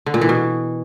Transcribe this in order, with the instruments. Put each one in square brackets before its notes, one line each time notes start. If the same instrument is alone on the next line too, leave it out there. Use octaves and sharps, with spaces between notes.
[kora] D3
A#2
E3
B2